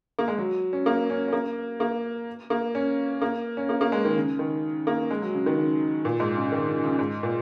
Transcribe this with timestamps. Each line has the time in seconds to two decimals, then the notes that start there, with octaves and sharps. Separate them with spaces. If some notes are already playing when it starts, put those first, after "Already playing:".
0.19 A#3
0.28 G#3
0.38 F#3
0.73 C#4
0.86 A#3
1.10 C#4
1.28 C#4
1.33 A#3
1.80 A#3
2.50 A#3
2.75 C#4
3.22 A#3
3.57 C#4
3.69 A#3
3.81 A#3
3.92 G#3
4.05 D#3
4.16 C#3
4.39 D#3
4.87 A#3
5.11 G#3
5.22 F#3
5.34 C#3
5.46 D#3
5.57 C#3
6.05 A#2
6.20 G#2
6.37 C#3
6.52 D#3
6.68 C#3
6.83 C#3
6.99 G#2
7.23 A#2